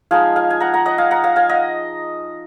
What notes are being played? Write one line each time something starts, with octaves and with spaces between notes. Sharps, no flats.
F3 G#3 D#4 F5 G#5
F5 G#5
G#5
F#5 A#5
F#5 A#5
D#5 F#5
F5 G#5
F#5 A#5
F5 G#5
F5 G#5
D#5 F#5